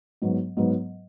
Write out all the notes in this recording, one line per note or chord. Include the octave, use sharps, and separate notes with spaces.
G#2 F#3 B3
G#2 F#3 B3